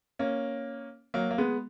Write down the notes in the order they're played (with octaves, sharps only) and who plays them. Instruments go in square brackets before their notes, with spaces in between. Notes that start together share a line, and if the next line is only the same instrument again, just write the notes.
[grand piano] A#3 C#4
F#3 A#3
A#3
G#3 B3